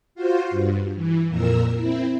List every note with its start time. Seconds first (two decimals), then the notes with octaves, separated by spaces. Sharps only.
0.15 F4 F#4 C5
0.50 G2
0.95 E3
1.28 F2 A#2 A#4 E6
1.77 C4 E4